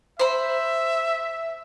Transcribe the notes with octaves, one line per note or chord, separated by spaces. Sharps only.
C5 E5 B5